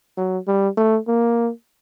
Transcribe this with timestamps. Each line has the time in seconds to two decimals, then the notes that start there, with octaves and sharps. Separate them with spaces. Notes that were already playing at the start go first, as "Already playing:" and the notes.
0.17 F#3
0.48 G3
0.77 A3
1.08 A#3